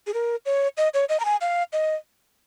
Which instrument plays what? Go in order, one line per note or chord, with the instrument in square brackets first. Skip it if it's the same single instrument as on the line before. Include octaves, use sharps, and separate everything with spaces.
[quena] G#4
A#4
C#5
D#5
C#5
D#5
A#5
G#5
F5
D#5